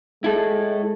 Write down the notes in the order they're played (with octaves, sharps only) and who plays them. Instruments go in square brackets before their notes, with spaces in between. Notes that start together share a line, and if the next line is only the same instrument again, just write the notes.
[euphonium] G#3 [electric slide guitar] E4 A4